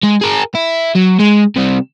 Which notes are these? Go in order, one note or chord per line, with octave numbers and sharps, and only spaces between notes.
G#3
G#4 A#4
E4
F#3
G#3
C3 G3